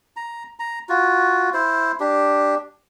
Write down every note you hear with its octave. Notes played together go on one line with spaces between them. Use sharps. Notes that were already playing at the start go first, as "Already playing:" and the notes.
A#5
A#5
F4 F#4
E4 C5
D4 G4